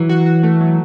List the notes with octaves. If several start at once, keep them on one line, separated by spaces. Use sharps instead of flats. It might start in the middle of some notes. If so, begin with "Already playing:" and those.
Already playing: E3 F#3
F#4
F#4
A3
F#3